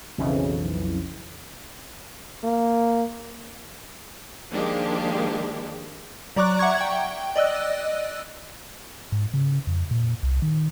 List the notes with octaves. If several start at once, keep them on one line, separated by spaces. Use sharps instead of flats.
B1 F2 C#3 E3
A#3
D#3 F3 G#3 A#3 D4 G4
F#3 D5 A#5 C#6 D6 F#6
E5 F#5 A#5 C#6 G#6
G5
D5 D#5 E6 F#6
G#2
C#3
F2
A#2
C2
D#3